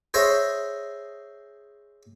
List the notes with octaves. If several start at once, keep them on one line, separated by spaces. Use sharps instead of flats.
G#4 C5 C#5 D#5 E5 C#6